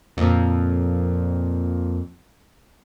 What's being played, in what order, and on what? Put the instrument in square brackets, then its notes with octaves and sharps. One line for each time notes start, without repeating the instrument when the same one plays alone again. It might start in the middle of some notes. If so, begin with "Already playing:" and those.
[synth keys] F2 A#2